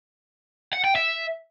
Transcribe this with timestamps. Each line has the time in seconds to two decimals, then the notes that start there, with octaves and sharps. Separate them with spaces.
0.73 F#5
0.84 G5
0.95 E5